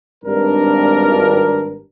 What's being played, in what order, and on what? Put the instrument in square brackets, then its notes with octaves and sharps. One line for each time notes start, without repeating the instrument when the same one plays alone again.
[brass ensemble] G#1 G2 D4 A#4